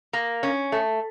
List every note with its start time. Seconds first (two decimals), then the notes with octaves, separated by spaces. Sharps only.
0.13 A#3
0.43 C#4
0.72 A3